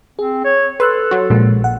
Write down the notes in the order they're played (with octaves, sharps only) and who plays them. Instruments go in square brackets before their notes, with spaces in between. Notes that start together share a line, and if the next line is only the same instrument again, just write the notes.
[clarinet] C4 [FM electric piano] G#4
[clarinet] C#5
[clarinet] A4 [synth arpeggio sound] B4 [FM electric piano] C6 E6 F#6
[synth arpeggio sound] F#3 F#4
[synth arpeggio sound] A#1 A#2 [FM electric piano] G#3 A#3
[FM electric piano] F#5